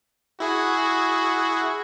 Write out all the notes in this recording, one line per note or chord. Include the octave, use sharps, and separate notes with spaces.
E4 F#4 G#4